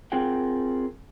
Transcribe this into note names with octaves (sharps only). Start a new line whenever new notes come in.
C4 F4 G#4 A#4 F#5 G5